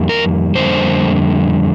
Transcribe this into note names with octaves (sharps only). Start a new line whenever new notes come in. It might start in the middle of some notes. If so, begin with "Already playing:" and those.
Already playing: F2 D#3 G3 A#3
A#4
F2 D3 G3 A#3 C5